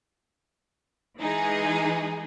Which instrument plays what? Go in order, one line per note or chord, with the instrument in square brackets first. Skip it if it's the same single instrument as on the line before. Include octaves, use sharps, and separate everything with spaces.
[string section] E3 G#3 D#4 G#4